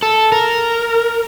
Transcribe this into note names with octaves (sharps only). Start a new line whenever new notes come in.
A4
A#4